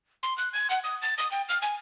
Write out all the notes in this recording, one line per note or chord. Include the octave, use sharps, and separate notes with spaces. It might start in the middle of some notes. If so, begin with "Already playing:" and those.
C6
F#6
G#6
F#5
D#6
A6
D#6
G5
F6
G#5